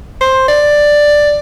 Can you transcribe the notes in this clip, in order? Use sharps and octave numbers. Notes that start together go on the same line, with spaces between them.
C5
D5